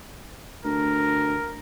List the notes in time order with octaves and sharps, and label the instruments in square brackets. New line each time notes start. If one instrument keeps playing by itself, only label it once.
[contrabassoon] D2 [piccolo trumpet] A#4